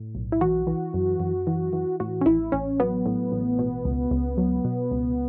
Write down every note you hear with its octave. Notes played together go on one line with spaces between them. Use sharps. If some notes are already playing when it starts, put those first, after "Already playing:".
Already playing: A2
B1
E4
E3 F#4
E3
F#2
F#2
E3
E3
A2 F#4
C#4
A1 E4
A1 C#4
F#3 B3
A2
A1
B2
C#2
C#2
F#3
B2
C#2